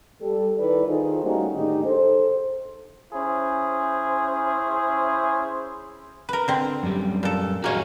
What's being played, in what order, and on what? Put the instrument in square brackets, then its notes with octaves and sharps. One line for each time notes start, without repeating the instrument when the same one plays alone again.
[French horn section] G3 A4
D#3 E4 A4 B4 D5
D#3 D#4 F4 G#4 A4 C5
G3 A3 A#3 C#4 D#4 F#4
A2 D3 D#3 D#4 G4 G#4
A4 C5
[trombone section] C#4 E4 G#4 C5
[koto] A#4 B4
D3 C4
[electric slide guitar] F#2 G3
[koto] A#2 A4
[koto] A#3 C#5 [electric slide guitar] F#4 G#4 D#5